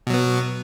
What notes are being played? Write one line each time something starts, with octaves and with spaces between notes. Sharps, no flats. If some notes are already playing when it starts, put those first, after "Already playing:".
B2 F#3 B3